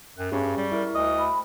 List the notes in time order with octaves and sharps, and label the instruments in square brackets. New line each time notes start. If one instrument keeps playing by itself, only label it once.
[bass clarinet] F#2 [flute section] G5 F#6
[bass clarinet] G2 [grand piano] C#4 G4 G#4 [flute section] C#6
[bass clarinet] G3
[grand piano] E4 A#4
[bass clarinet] D2 [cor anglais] D#5
[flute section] B5